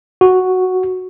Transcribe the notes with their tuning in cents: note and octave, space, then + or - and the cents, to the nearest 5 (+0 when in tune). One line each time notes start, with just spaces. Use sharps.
F#4 +0